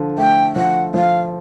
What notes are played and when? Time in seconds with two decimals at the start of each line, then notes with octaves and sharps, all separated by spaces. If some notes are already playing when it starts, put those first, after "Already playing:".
Already playing: D3 F3
0.18 A3 G5
0.56 F3 F#5
0.94 F3 F5